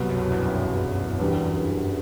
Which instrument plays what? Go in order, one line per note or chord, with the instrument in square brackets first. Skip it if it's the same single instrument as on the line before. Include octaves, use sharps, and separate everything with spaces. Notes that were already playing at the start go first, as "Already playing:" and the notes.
Already playing: [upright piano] C2 B2 F#3 B3
[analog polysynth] F#2
E2 G2
[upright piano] E2 D3 G3 B3